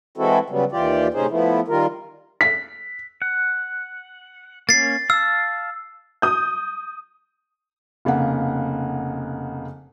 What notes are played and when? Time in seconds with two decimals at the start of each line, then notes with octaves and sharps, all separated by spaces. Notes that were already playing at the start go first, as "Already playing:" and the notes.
0.18 E3 G#3 C4 E4 F#4 A4
0.50 C#3 F#3 G3 B3
0.72 D#2 E3 F4 G4 D5
1.14 A2 C3 C#4 D#4 G#4 C5
1.31 F3 A3 B3 E4
1.68 D#3 G3 F4 A#4
2.41 B6
3.22 F#5
4.69 A#3 C#4 A6 C7
5.10 F5 A5 E6
6.22 D#6 G6
8.05 F1 C#3 A#3 F#5